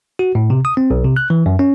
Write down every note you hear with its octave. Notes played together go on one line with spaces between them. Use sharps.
F#4
A2
C3
D#6
C4
B1
C3
F#6
E3
F#2
C#4